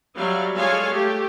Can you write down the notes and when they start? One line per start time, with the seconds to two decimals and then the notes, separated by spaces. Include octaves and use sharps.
0.16 F#3 G3 E5 F5
0.55 G#3 F4 G#4 A4 C#5 F5
0.90 A3 G4